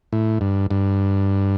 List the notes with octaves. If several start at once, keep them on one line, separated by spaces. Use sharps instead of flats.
A2
G2
G2